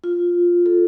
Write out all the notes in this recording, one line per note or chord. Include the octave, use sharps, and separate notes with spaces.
F4
A4